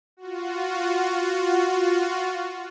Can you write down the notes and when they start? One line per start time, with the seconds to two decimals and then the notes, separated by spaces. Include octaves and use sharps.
0.17 F4 F#4